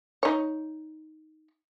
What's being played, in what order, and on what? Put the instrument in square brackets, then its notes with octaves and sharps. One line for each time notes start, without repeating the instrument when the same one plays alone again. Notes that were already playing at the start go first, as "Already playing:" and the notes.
[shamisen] D#4 C#5